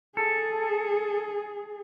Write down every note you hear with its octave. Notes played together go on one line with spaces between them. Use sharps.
G#4 A4